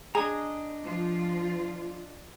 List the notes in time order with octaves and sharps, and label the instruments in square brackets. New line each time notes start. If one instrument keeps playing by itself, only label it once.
[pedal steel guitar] D4 D#5 A#5 [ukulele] G#4
[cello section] F3 F4